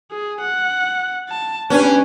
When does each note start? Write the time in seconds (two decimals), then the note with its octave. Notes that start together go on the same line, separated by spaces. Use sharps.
0.11 G#4
0.41 F#5
1.29 A5
1.70 G3 B3 C#4 D4 G#5